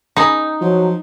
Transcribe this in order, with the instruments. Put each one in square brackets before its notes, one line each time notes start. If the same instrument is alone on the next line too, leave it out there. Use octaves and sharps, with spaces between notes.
[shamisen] C#3 G#4 B5 [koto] D#4
[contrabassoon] F3 [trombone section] F#3